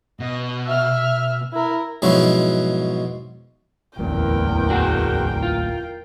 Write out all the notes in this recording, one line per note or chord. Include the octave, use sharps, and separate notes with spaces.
B2 D#5
E5 F6
E4 A#4
G#2 B2 F3 F#3 E4
D1 A1 E2 A#2 A#4 G5
F#4 G#4
F4